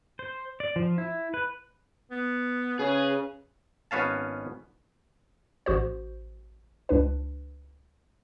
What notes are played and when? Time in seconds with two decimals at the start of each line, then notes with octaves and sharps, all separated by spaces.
0.19 C5
0.60 D5
0.76 F3
0.98 E4
1.34 B4
2.11 B3
2.79 C#3 G#4 B4
3.91 G#1 B3 C#4 F5 A5
5.66 A1 F#4 C5
6.89 C#2 D4 B4